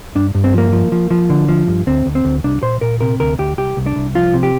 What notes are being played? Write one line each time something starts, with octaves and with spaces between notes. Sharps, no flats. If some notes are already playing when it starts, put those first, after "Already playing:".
G2 D4
G2
C4
F3 A#3
F3
F3
F3
D3
F3
G2
D2 C4
D2
C4
D2
C2 D4
A#2 C5
A#2 A#4
C3 A#4
D2 A#4
D2 G4
C2 G4
C2
D4
C2
F3 F4
C3
G4